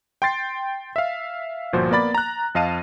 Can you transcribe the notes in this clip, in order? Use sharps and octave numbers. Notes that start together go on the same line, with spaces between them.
G5 C6 A6 C7
E5 F5
G1 A#2 F3 F#4 C5
A#3 B3 D5 B5 A6
A#5 F#6
F2 D#5 F5 A5 D#7